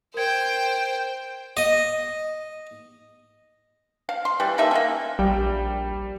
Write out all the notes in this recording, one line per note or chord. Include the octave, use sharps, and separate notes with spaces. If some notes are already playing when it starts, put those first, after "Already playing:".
A#4 C5 G5 G#6
D#5
F5
C6
E3 G3
A#3 D#4 A4 E5
A#3 B3 C#4
A#1 G3 G5